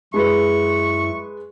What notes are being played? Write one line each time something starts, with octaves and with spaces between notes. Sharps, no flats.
F#2 G#3 E4 B4 C#6